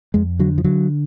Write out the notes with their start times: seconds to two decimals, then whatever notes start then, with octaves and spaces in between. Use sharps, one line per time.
0.14 F2 G#3
0.39 D3 F#3
0.58 F3
0.64 D3 F#3